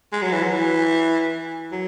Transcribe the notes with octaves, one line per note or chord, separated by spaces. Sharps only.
G#3
F#3
E3
F#3
E3
F#3